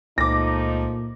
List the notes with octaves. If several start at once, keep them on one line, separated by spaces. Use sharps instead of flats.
C#2 A#2 F3 A3 D#4 D6 A#6